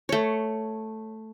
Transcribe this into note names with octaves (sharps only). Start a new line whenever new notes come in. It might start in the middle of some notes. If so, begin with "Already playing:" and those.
A3 C#5